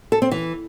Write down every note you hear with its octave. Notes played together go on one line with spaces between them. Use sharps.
A4
C4
E3